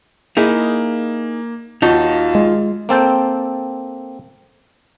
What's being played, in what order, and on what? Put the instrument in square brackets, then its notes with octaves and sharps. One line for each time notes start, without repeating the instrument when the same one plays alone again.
[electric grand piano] A#3 [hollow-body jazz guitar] D#4 E4 G#4
[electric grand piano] D#2 A5 [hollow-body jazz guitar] D#4 F#4 [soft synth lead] F4
[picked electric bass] G#3
[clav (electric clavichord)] A#3 C4 A4 G5